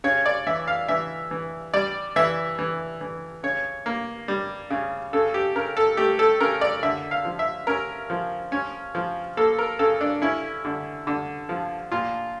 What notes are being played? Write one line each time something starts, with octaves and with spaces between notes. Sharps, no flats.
C#3 C#5
D5
E3 E5
F5
E3 E5
E3
G3 D5
E3 E5
E3
E3
C#3 C#5
A#3
G3
C#3
C#3 A4
G4
C#3 A#4
A4
A3 G4
A4
C#3 A#4
D5
D3 E5
F5
F3
E5
C#4 A#4
F3
C#4
F3
A#3 A4
A#4
C#3 A4
D4
C#4 E4
D3
D3
F3
A#2 F4